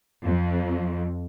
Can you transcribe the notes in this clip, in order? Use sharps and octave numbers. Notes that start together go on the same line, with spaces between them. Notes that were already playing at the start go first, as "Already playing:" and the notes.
F2